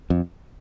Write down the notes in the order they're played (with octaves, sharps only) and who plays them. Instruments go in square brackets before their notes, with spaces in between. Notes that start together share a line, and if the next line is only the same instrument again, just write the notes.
[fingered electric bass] F2